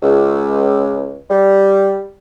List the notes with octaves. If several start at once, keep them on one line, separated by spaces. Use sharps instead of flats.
C#2
G3